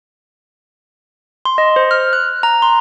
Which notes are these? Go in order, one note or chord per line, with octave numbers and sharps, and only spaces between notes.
C6
D#5
C5
F6
F#6
A#5
C6